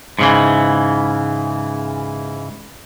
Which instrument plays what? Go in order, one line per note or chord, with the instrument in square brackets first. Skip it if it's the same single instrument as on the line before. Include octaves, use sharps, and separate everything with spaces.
[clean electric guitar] G#2 C#3 E3